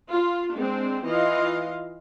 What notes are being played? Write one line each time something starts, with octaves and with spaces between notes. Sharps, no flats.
F4
G#3 C4 D4
E3 F4 D#5 F5 C6